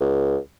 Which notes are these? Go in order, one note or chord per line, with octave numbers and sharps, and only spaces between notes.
C#2